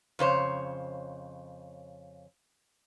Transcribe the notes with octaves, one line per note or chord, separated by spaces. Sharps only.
F2 C#3 C5 C#5